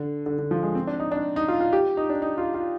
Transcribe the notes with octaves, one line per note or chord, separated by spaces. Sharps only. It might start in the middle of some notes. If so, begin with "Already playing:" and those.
Already playing: D3
D3
D3
F3
G#3
C4
D4
D#4
D4
D#4
F4
F4
G4
D#4
D4
D#4
F4
F4